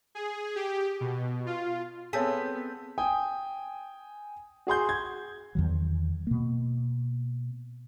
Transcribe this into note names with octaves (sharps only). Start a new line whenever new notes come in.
G#4
G4
B2
F4
B3 C4 G#4 A4 C#5 G6 B6
G5 G#5 D#6
F#4 G#4 C6 G6
G#6
E2 D#3 F#3
B2 A#3